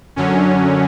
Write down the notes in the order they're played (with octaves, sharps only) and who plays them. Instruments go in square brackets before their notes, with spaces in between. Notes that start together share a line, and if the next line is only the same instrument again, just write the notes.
[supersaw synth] F#2 D3 F#3 C#4